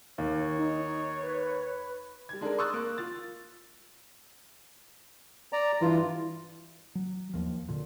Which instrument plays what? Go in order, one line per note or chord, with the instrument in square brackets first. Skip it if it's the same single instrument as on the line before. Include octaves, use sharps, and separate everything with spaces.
[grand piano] D#2 [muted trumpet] C#5
[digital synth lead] D#4
B4
[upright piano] G3 G#6
G#3 D4 A4 A#4
C6 C#6 D#6 E6 F#6 A6
A#3
F4 A6
[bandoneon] D5 A#5
[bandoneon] G2 F4 [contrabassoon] E3
[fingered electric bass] F#3
D#2 F3
A#2 D3